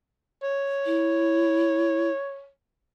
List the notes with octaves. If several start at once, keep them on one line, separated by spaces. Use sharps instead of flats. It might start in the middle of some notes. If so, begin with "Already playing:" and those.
C#5
E4